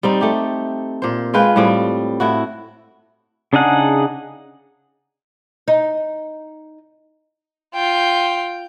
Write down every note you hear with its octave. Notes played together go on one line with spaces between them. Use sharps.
G3 C4 D#4
A3 G4
A#2 C5
G#3 F4 B4 G5
A2 G3 C4
A2 E4 F#4
C#3 D4 D#4 G#4 F#5
D#4
F4 G5